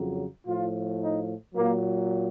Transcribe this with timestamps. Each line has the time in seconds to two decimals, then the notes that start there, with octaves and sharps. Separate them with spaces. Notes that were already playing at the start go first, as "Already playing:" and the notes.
Already playing: F2 C#3 F#3
0.47 A2 F3 F4
1.00 D#4
1.54 A#2 F#3 A#3